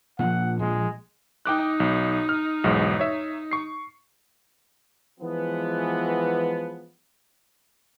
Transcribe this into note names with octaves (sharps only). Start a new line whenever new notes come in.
A#2 F3 A#3 F#5
A#1 F3 G#3
D#4 G5 D6 F#6
B1
F6
B1 E2 G#2
C#5 E5
C#6 C7
E3 F3 G#3 B3